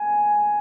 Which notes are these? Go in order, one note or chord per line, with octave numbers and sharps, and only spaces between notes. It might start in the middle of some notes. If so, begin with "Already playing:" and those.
Already playing: G#5